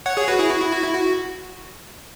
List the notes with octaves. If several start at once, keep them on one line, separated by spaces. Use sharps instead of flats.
C#5 F#5
G#4 C#5
F#4 B4
E4 G#4
F#4
E4
F#4
E4
F#4